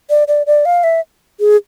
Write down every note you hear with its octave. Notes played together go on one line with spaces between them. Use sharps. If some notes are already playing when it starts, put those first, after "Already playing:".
D5
D5
D5
F5
E5
G#4